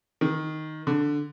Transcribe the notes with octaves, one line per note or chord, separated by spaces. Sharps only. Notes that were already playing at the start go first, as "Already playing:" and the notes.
D#3
D3